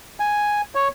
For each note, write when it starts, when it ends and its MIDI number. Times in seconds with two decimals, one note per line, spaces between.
0.20 0.61 80
0.75 0.88 73